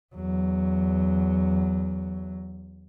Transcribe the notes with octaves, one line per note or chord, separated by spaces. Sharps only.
E2 F#3